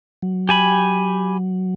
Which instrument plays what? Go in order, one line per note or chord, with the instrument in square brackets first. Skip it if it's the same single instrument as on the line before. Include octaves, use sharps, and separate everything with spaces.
[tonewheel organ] F#3
[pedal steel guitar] G4 G#5 B5